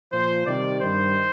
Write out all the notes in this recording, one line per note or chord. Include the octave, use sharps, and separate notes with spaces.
A#2 F3 C5
C3 D#3 G3 D5
G2 D#3 G3 C5